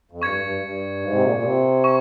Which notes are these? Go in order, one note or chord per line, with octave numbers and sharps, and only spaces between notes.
F2
G2 C#6 G#6 C#7
G2
G2
G#2
C3
A#2
A#2
C3
C#6